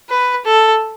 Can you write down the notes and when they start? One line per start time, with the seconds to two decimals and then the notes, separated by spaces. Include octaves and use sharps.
0.10 B4
0.45 A4